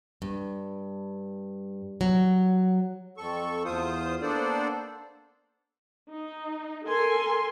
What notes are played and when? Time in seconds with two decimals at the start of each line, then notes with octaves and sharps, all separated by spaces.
0.22 G2
2.01 F#3
3.17 F2 A4 C#6
3.65 E2 F4 C5 D#6
4.22 A#3 B3 D4 A4 C5 D5
6.11 D#4
6.86 A4 A#4 G#5 C6